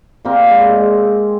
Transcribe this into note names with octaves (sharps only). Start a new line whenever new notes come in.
A#2 A#3 C4
G#3
G#3